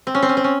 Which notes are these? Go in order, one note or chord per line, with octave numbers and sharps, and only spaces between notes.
C4
C#4
C4
C#4
C4
C#4